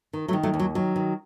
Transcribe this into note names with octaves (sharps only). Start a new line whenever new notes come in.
D#3
F#3 A3
D#3
F#3 A3
D#2
F#3
D#3 F#3
D#3